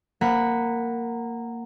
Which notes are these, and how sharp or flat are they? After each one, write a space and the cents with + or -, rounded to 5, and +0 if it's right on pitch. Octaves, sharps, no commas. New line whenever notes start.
A#3 -10 F#5 +0 B5 +5